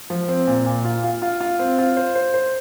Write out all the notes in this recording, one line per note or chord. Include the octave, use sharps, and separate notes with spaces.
F3
C4
A#2
A#2
F4
F4
F4
F4
C4
F4
C5
C5
C5